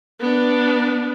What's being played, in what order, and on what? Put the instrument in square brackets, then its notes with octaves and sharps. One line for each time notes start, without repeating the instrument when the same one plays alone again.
[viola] B3 D4